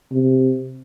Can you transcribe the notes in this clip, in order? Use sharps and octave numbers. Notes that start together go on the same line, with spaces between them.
C3